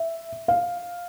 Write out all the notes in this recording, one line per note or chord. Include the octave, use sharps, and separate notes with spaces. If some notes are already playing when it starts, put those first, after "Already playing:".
Already playing: E5
F5